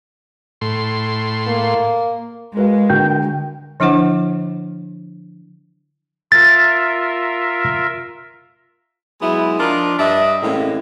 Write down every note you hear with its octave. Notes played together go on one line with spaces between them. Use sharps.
A2 C6
A#3
G#3 F#4 A#4 B4 F5
D3 F#4 A#4 G5
D3 F3 D4 E4 C5 F#5
F4 A#4 E5 A6
F#3 G#3 B3 E4
F3 D4 D#4 F4 A#4
G2 D4 D#5 E5
A2 C3 E3 G#3 A#3 C#4